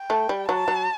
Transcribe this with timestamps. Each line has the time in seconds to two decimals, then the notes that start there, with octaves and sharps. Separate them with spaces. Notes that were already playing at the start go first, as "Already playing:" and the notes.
Already playing: G5
0.10 A3
0.29 G3
0.48 F#3 A5
0.68 F#3